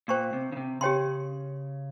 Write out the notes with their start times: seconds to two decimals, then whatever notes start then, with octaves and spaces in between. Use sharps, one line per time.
0.08 A#2 C5 G5 C#6
0.33 C3
0.52 C#3
0.57 C3
0.81 C#3 G4 C#5 G5 C6